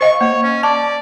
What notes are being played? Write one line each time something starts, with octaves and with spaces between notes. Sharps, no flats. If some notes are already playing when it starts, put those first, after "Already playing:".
C5 D#5 F5 C#6
A#3 C#5
C#4
D5 A5